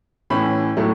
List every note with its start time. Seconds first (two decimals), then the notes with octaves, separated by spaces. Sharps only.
0.30 A2 E3 C#4 B5
0.77 A2 F#3 A3 E4